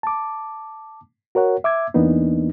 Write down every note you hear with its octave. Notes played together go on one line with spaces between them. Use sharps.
A5 D6
F#4 A#4 C#5 F#5
E5 D6 E6 G#6
E2 E3 A#3 B3 D4 D#4